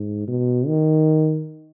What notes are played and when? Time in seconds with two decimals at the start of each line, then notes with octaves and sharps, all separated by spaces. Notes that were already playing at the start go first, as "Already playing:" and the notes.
Already playing: G#2
0.28 B2
0.67 D#3